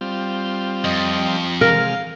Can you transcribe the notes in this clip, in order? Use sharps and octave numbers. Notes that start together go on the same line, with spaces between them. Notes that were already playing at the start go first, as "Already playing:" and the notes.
G3 C4 F4
F2 D#5
C3 G#3 A#4 F5 F6